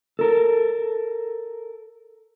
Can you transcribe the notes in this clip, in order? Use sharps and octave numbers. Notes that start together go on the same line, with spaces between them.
A4 A#4